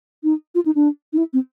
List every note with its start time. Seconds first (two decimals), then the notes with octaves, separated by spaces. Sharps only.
0.23 D#4
0.55 F4
0.66 D#4
0.75 D4
1.13 D#4
1.17 E4
1.33 C4